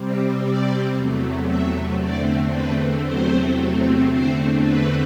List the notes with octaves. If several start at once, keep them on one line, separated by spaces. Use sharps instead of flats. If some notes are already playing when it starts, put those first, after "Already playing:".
Already playing: C3 G3 C4
D5
E2 C3 F#3 A3
E5
E2 D3 A3 C4 D5
B4
E2 C3 F#3 A3 C4 C5
E2 D3 A3 C4 C5
B4